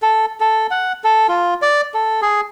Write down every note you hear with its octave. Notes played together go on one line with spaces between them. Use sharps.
A4
A4
F#5
A4
F4
D5
A4
G#4